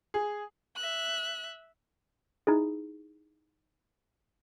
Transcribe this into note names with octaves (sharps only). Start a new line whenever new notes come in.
G#4
E5 F#6
D#4 E4 G#4